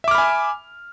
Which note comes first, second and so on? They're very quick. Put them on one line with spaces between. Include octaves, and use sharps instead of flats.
E5 D6 F6 B5 G#5